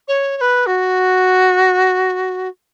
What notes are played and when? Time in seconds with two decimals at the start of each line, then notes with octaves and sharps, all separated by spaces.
0.07 C#5
0.37 C#5
0.40 B4
0.66 F#4